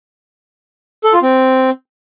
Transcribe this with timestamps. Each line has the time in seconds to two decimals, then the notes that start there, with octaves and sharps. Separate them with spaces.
1.04 A4
1.13 F4
1.23 C4